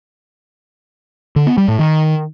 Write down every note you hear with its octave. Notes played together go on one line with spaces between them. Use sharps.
D3
B3
G3
A2
D#3